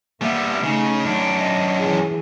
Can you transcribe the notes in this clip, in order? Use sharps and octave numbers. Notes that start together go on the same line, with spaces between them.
G3 A#3 B3 E5
C#3 A3 D#4
F#2 D4
D#5
E3 G#4